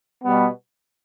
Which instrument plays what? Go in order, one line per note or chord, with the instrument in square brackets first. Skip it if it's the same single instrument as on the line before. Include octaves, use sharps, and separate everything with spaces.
[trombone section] B2 G3 B3